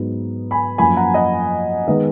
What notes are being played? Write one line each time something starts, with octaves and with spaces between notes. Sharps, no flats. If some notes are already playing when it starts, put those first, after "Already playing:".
Already playing: G#2 F#3 B3 D#4
G#5 B5
F#2 F3 A#3 G#5 B5
F#5 A#5
D#5 F#5
D#3 G#3 B3 D#4 B4 D#5